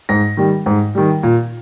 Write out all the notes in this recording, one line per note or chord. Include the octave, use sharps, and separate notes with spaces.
G#2 A#6
D#3 G3
G#2
D#3 G3
A#2